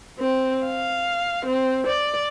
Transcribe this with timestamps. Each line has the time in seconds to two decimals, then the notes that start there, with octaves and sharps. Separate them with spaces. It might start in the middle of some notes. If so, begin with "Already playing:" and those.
0.19 C4
0.67 F5
1.45 C4
1.87 D5